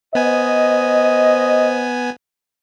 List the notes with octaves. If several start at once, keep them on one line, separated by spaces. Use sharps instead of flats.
B3 C5 D#5 G#5